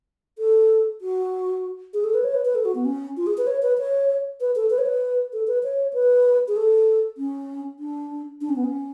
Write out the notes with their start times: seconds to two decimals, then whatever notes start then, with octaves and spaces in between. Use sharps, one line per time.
0.38 A4
1.01 F#4
1.94 G#4
2.04 A4
2.14 B4
2.24 C#5
2.34 B4
2.45 B4
2.55 A4
2.65 F#4
2.75 B3
2.85 C#4
3.17 F4
3.27 G#4
3.38 B4
3.47 C#5
3.62 B4
3.79 C#5
4.41 B4
4.56 A4
4.70 B4
4.78 C#5
4.86 B4
5.33 A4
5.47 B4
5.64 C#5
5.94 B4
6.48 G#4
6.56 A4
7.18 C#4
7.79 D4
8.41 D4
8.49 C#4
8.56 B3
8.64 C#4